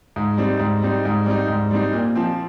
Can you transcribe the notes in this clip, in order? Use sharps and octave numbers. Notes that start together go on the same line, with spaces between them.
G#2
G3 C4 D#4
G#2
G3 C4 D#4
G#2
G3 C4 D#4
G#2
G3 C4 D#4
A#2
F3 C4